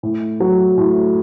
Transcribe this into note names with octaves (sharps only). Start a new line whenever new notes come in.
A2
F#3
A2